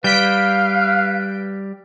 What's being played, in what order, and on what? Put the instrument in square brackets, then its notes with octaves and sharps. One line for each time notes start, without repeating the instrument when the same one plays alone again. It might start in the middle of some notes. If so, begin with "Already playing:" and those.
[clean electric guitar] G3 [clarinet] B4 [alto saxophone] F5 [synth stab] G6 B6 D7